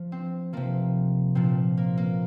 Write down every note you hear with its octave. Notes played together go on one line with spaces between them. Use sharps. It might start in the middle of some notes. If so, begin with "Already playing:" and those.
Already playing: F3
C4
C3 F3 A#3
A#2 F3 C4
A#3
A#3